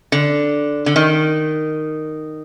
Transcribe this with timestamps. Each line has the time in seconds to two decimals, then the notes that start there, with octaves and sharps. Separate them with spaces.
0.12 D3
0.86 D3
0.96 D#3